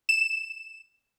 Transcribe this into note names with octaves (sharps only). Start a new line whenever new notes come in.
E7